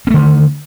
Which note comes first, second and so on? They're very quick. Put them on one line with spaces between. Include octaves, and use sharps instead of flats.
C4 A3 D3 D#3